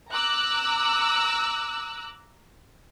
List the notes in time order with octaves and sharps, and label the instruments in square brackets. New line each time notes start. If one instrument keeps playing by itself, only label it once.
[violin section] A#5 D6 E6 F#6